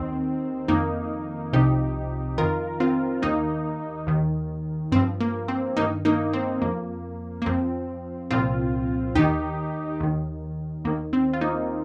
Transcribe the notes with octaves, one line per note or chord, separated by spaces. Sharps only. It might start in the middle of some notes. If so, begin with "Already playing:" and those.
Already playing: D#2 D#3 C4
F2 D#3 A#3 D#4
C2 C3 F3 D#4 G4
F2 D#3 F4 A#4
C4 F4
D#2 D#3 A#3 D#4
D#2 D#3
G2 F3 C4
A#3
C4
G2 D#3 A#3 D#4
A#3 D#4
C4
F2 F3 A#3
A#3
F2 F3 C4
C2 A#2 F3 C4 F4
D#2 D#3 D#4 G4
D#2 D#3
D#2 D#3 A#3
C4
F4
A#3 D#4